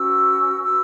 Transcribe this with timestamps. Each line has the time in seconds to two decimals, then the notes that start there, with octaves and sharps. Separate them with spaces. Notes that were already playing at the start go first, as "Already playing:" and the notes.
Already playing: C#4 F#4 B4 E6
0.63 F#4 B4 E6